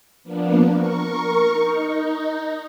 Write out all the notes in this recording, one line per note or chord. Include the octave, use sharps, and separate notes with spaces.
F3 A#3 B3 D4
A#4 C#6
D#4